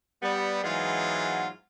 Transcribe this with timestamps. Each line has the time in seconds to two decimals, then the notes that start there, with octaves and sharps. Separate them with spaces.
0.22 G3 B3
0.63 G#2 E3 F#3 G#3 B3 F4